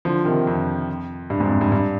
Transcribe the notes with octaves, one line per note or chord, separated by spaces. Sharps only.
D3 F3
C3 D#3
F2
G2
F2 G#2
G2
G2